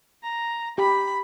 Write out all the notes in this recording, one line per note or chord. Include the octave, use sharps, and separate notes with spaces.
A#5
G4 B5